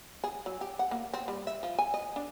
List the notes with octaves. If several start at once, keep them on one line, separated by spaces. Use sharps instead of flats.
G#4
F#3
G4
F#5
A#3
C4
G3
E5
F3
G#5
D#5
D4